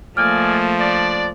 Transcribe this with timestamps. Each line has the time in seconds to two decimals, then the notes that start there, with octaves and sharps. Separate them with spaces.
0.17 F3 A3 A#3 D5 D#5 G#5 F6
0.79 D4 D5